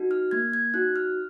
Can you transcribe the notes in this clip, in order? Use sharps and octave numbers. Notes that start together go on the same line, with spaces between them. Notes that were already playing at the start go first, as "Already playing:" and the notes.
Already playing: D#4 F#4
F6
A#3 G#6
G#6
D#4 F#4 F#6
F6